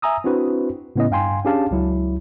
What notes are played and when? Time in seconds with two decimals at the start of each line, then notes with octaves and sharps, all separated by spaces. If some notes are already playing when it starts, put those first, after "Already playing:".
0.02 E5 G#5 A#5 D#6 E6
0.24 C4 D4 E4 F#4 B4 C5
0.96 A2 C#3 B3 C#4 E4 D#5
1.11 G2 F5 G5 G#5 C6
1.45 C#4 D4 G4 G#4 F5 A5
1.71 C#2 F#3 E4